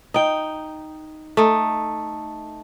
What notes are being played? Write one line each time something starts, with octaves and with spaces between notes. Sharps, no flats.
D#4 G5
A3 D#4